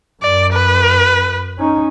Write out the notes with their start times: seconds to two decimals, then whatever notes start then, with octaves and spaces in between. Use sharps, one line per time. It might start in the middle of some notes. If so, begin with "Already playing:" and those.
0.23 F#2 D5
0.53 B4
1.58 C#4 D#4